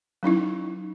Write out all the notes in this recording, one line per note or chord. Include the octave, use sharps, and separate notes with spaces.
F#3 C#4 D#4 E4